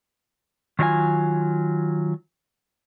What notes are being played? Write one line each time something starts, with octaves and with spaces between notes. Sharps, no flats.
D#3 F#3 D4 F4 G#5